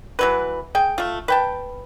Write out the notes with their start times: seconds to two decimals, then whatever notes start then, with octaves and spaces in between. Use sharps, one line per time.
0.19 E3 F#3 B4
0.75 G#4 G5
0.98 A3 F4
1.28 B4 G5 A5